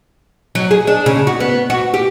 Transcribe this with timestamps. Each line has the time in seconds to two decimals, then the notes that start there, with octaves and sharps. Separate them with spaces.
0.55 F#3
0.71 G#4
0.87 D4
1.06 C#3
1.27 F#4
1.40 B3
1.70 F#4
1.94 G4